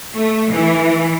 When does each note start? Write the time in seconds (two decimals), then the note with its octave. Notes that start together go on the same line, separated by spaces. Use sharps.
0.14 A3
0.52 E3